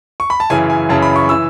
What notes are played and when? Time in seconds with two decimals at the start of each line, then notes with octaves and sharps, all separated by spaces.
0.20 C#6
0.30 B5
0.40 A5
0.50 F#2 C#3 E3 G#5
0.70 G#5
0.89 F#2 C#3 E3 A5
1.02 B5
1.16 C#6
1.29 E3 E6